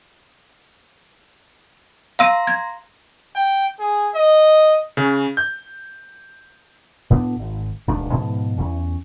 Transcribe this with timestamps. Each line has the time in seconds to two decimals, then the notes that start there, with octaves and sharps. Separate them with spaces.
2.19 F5 A#5 C6 E6 A#6 D#7
2.47 G#6
3.35 G5
3.79 G#4
4.15 D#5
4.97 C#3
5.37 G6
7.10 A2 B3 D4
7.39 G#1
7.88 D#1 C#2 D#3 D4
8.13 G#2 B2 F3
8.58 E2 C#4